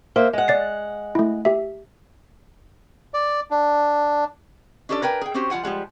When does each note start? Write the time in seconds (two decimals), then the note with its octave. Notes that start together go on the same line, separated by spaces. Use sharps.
0.16 A#3 C5 E5
0.33 G#3 F#5
0.48 D5 A6 C7
1.15 A3 E4
1.45 G4 E5
3.14 D5
3.51 D4
4.89 C#4 D4 G4 A4 B4 D5
5.02 A#4 B4 G5 G#5
5.21 G#4 G5
5.34 C4 C#4 F#4 G4 C5
5.50 F3 G3 F4 F#5 G#5
5.63 F3 G3 G#3 F#5